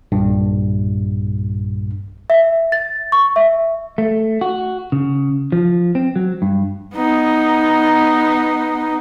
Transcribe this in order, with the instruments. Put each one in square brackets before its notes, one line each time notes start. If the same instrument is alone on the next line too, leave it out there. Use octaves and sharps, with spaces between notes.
[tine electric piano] B1 G2 A#2
[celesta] E5
A6
C#6
E5
[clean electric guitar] A3
F#4
C#3
F3
C4
F#3
G2
[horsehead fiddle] B3 D#4